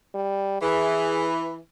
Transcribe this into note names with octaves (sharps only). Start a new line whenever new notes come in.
G3
E3 G#4